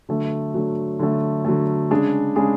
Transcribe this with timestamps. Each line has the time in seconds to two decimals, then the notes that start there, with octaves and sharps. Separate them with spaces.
0.09 D3 F#3 A3
0.54 D3 F#3 A3
0.99 D3 F#3 A3
1.45 D3 F#3 A3
1.90 C#3 G#3 D4 G#4
2.36 C#3 G#3 D4 G#4